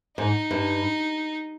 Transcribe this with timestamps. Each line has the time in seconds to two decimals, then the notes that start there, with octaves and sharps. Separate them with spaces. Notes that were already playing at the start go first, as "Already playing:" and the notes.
0.17 G#2 D#4
0.51 G2